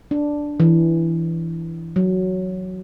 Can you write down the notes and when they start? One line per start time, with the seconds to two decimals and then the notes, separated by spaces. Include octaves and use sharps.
0.11 D4
0.60 E3
1.96 F#3